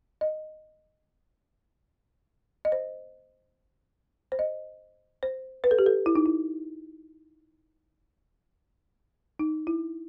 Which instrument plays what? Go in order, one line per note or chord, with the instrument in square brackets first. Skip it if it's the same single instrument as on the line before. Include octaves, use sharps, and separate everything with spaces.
[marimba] D#5
D#5
C5
C5
D#5
C5
B4
A4
G4
A4
E4
D#4
E4
D#4
E4